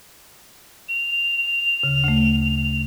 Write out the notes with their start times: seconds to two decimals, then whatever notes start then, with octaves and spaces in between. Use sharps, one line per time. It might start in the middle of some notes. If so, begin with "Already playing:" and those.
0.89 F7
1.83 D2 C#3
2.04 D2 A3